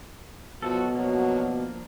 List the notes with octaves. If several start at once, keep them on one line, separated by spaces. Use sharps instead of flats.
B2 F3 F#3 F#4 A4
F3 F#3 A#3 D4